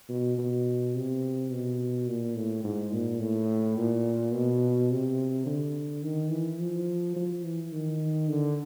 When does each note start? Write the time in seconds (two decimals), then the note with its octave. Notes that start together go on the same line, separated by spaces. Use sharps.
0.09 B2
0.38 B2
0.95 C3
1.51 B2
2.07 A#2
2.35 A2
2.64 G#2
2.92 A#2
3.20 A2
3.77 A#2
4.33 B2
4.90 C3
5.46 D3
6.03 D#3
6.31 E3
6.59 F3
7.16 F3
7.44 E3
7.72 D#3
8.29 D3